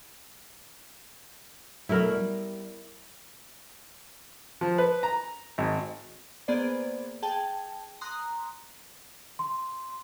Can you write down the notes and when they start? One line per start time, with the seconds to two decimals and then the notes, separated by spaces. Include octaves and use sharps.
1.89 B2 F#3 A3 E4 A#4
2.11 G3
4.61 F3
4.78 B4
5.03 A#5
5.58 G#1
6.48 A#3 B3 G#4 C5 D5
7.22 G#4 G5 A5
8.01 A#5 C6 D#6 F#6
9.39 C6